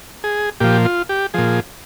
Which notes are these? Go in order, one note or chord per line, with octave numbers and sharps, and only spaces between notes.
G#4
A#2 F3 G4
F4
G4
A#2 F3 G#4